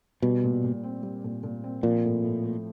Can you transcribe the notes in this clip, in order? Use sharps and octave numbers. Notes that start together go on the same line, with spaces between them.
B2 G3
A#2
A#2
C4
G3
A#2
A#2
C4
A#2 F3
A2
A2
A3